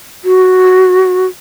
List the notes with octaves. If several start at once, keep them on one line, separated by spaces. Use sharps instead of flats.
F#4